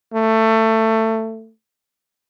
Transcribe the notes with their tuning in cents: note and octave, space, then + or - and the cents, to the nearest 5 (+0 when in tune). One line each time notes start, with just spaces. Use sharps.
A3 +20